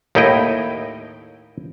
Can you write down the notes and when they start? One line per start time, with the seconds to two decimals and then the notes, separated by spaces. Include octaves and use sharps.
0.15 D#2 A2 D#4 E4 D#5 G5